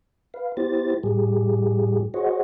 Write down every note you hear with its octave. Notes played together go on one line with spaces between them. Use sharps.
B4 F5
B3 E4 G4 C5 A6
A2 G3 G4 G#4
F#4 G#4 C5 C#5 D#5 F#5